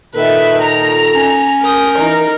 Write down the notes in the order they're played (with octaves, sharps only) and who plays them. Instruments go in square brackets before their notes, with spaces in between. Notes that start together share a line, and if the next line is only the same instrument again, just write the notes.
[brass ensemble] A#2 D#3 A4 [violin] B4 E5
[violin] A#5 F7
[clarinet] C#4
[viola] A#4 [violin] D#6 G6
[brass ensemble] E3 A#5 [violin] D#4